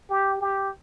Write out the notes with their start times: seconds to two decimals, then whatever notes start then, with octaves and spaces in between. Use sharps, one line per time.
0.09 G4
0.41 G4